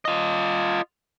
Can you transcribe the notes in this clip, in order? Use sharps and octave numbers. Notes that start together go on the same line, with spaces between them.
F4 D#5